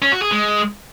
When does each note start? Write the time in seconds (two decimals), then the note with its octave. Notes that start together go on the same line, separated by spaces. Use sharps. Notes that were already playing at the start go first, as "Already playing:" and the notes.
0.02 C#4
0.12 F#4
0.22 G#4
0.32 G#3